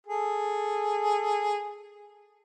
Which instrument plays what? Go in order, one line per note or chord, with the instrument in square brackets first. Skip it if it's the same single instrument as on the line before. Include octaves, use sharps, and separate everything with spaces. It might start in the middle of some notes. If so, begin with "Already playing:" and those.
[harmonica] G#4 A4